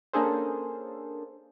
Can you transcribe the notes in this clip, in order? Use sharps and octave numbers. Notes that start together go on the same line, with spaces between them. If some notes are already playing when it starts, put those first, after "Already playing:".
A#3 C#4 D4 G#4 A4 C5